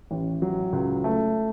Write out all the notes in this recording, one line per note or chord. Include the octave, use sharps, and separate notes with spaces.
A1
F#3
C#2
A3